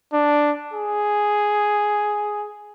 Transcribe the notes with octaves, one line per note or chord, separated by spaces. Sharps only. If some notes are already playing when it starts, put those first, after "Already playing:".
D4
G#4